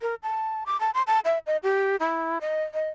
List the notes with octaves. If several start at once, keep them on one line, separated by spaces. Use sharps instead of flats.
A#4
A5
D6
A5
C6
A5
E5
D#5
G4
E4
D#5
D#5